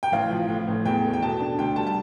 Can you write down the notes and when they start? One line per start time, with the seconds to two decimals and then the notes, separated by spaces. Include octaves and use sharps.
0.03 G5
0.12 A1 F5
0.30 F3
0.48 A2
0.68 A1
0.85 E2 G5
1.04 A3
1.13 G5
1.22 B2 A5
1.40 D4
1.58 D2 G5
1.76 G3 A5
1.87 A5